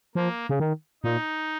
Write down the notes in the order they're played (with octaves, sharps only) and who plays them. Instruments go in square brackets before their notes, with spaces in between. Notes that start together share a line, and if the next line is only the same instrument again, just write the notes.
[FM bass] F3 [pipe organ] A#3
[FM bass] C#3
D#3
[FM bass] A#2 [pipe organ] D#4